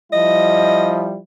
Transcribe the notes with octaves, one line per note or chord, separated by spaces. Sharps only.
F3 G3 E4 D#5